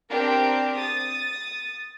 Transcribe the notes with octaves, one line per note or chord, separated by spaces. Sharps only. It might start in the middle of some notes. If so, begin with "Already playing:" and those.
C4 D4 G4 A#4
D#6 A6